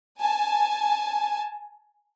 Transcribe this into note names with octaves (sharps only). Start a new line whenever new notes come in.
G#5 A5